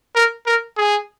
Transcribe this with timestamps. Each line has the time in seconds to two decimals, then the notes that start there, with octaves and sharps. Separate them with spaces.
0.15 A#4
0.47 A#4
0.77 G#4